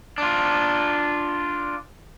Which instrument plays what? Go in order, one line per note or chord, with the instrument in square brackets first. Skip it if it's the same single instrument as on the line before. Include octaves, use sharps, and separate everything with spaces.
[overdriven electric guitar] D4 F4